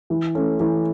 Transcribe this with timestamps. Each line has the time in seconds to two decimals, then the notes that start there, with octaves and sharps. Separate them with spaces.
0.10 E3
0.35 A3 C#4
0.60 E3